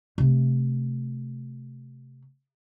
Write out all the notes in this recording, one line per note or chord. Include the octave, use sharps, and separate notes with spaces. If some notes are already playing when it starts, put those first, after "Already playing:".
C3 A3